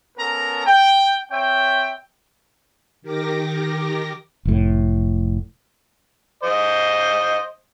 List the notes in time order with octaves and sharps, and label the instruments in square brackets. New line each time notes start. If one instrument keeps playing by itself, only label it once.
[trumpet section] B3 C#4 A4 A#4 A#5
G5
C4 C#5 E5 G5
[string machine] D#3 G4 A#4 D6 A#6
[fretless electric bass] F1 A2
[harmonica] C5 D#5